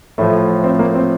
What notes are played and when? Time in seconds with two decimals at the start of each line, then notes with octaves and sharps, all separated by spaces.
0.18 A2 F3 A3
0.64 C4
0.79 A#3
0.95 C4